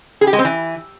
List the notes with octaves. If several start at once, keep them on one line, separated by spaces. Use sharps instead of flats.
G#4
G4
G#3
C4
E3